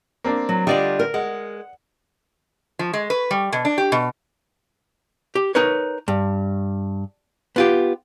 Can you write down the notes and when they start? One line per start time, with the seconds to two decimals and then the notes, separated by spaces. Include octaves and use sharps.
0.24 A#3 C4 D4
0.49 F#3
0.67 D3 G3 D4 F4 D5 D#5
0.99 A#4
1.14 G#3 F#5
2.79 F3
2.93 G#3
3.10 B4
3.31 G3
3.53 B2
3.65 D4
3.78 G4
3.92 B2
5.35 G4
5.55 D#4 A#4 B4 C#5
6.08 G2
7.56 B3 F4 G4